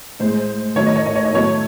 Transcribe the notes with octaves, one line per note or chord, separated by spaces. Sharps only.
A2 G#3 C5
D#3 F#3 A3 C#5
D#5
C#5
D#5
C#5
D#5
A2 F#3 A3 C#5